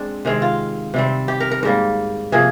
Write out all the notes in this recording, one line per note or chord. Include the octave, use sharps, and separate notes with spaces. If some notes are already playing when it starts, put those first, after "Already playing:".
Already playing: G#3 C4 D4
C3 D#3 G#3 C4
F4
C3 G3 C4
G4
A#4
A#4
G#2 G3 A#3 A#4
C3 F3 A#3 G#4